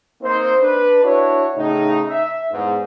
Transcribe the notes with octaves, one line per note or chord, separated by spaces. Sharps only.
A#3 C4 D#4 C5
D4 B4
D4 E4 F#4 C#5
A2 C#3 D#4
E5
E2 G#2